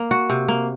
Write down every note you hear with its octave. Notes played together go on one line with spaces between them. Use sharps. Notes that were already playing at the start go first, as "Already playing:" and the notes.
Already playing: A#3
F#4
C3
A#3